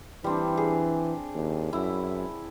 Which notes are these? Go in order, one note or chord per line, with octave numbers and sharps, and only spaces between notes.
E3 G3 C4 D4
G#4
D#2
F#2 E4